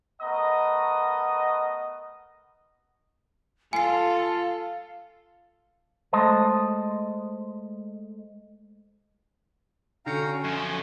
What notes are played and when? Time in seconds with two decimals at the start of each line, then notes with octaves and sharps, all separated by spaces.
0.21 A3 B3 A#4 D#5 F#5 D#6
3.73 F4 A4 F5 G#5 C7
6.13 G#3 A3 C5 D#5 A5
10.06 D3 C#4 F#4 F5 G5 A#5 C#6 C#7
10.44 F#2 F3 G#5